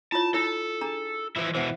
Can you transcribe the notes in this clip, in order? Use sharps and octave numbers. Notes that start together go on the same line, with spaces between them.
E4 F4 C#5 A5
D#4 E4 A4 C#5
D4 G#4 A#5
E3 F3 E4
B2 E3 C5 E5 F#5